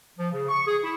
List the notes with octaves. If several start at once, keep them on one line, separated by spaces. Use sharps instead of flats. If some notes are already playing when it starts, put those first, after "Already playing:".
F3
C#3
C#6
G#4
E4